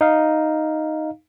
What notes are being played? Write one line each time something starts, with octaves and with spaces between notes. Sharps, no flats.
D#4 F5